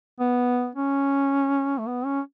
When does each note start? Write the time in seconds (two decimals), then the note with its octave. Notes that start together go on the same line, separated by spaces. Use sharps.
0.20 B3
0.75 C#4
1.78 A3
1.87 B3
2.05 C#4